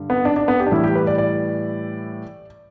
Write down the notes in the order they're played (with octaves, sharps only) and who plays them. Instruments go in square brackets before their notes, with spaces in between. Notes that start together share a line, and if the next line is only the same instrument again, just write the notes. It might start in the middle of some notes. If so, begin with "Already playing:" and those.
Already playing: [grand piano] G2 D3 G3
B3
D4
D4
B3
G4
D4
A2 E3 G3 E4
G4
B4
D5
D5